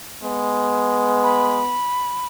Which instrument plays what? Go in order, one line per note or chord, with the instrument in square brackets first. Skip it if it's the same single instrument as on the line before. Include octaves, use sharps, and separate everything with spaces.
[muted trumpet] G#3 [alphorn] B3
[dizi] B5